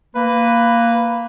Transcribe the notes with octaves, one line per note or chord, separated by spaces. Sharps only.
A#3 B4